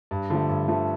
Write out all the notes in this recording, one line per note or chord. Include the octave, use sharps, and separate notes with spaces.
G2
D3 F3 A3
G2
D3 F3 A3